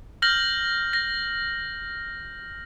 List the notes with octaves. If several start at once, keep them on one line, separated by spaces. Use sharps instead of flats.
F6 G6 A#6 F#7
A#6